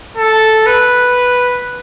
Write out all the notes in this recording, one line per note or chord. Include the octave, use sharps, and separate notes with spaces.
A4
B4